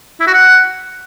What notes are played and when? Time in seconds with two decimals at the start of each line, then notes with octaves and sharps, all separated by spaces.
0.20 E4
0.27 F#4
0.34 F#5